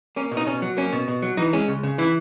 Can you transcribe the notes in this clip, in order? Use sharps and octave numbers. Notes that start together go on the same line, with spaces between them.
A#3 C#4
B2
D#4
B2 C#4
F#3
A#3 C#4
B2
B2
F#3
E3 D#4
G#3 C#4
C#2
C#3
E3 E4